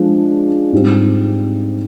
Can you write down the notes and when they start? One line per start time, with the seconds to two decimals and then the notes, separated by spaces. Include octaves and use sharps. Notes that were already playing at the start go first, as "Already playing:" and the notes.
Already playing: F3 G#3 D4
0.72 G#2 G3 C4